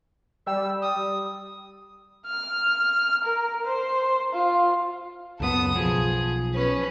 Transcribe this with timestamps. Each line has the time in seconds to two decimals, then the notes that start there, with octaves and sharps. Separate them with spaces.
0.47 G3 E6
0.82 D#6
2.27 F6
3.24 A#4
3.65 C5
4.33 F4
5.40 C#2 F#2 B3 A4 D#6
5.76 B1 F3 G#4
6.55 C#4 B4